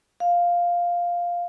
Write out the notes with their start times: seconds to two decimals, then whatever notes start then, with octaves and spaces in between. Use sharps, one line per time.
0.20 F5